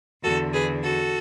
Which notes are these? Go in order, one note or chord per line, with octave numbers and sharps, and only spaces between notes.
E2 D3 F#4 A4
G#4 B4
F#4 A4